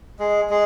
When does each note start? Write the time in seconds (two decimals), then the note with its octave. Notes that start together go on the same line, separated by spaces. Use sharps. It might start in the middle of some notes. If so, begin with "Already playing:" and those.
0.19 G#3 G#4
0.50 G#3 G#4